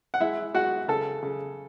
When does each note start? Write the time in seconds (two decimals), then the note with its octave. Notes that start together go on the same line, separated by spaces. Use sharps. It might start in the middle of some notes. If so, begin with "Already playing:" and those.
0.14 F#5
0.20 G#3 E4 E5
0.54 G#3 F#4 F#5
0.88 C#3 A4 A5
1.23 C#3